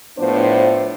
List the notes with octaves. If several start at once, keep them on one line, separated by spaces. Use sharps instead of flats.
A2 F3 B3 D4 C5